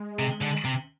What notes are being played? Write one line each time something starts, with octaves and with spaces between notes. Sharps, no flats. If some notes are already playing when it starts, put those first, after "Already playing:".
Already playing: G#3
C3
D3
C3